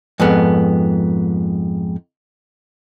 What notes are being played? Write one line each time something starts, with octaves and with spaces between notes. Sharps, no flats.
F2 G#2 B3